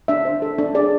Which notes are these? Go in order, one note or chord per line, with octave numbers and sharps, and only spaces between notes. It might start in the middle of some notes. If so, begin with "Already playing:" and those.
D4 E5
C5
A4
D4
G#4 D5